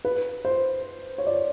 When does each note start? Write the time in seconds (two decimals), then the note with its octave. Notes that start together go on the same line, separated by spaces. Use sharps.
0.05 B4
0.45 C5
1.18 C#5
1.27 D5